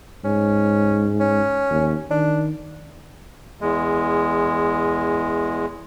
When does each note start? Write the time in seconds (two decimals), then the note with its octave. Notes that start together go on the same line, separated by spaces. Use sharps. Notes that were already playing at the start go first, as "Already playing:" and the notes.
0.25 G#2 C#4
1.20 C#4
1.70 D#2
2.11 D#3 D4
3.61 E2 G#3